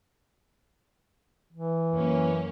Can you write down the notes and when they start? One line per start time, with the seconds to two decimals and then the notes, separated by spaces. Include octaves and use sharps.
1.53 E3
1.94 F#2 A#3 C#4